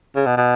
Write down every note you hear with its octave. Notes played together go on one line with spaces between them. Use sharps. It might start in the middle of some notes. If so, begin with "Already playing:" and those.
C#3
B2
B2